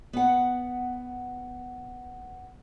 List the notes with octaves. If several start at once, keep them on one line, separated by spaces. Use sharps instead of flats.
B3 F#5